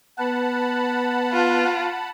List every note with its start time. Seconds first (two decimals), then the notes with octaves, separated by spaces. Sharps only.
0.18 B3 B4 F#5 A5 B5
1.33 F4